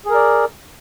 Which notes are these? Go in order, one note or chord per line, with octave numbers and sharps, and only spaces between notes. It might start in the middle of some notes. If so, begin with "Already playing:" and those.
G#4 A#4 D5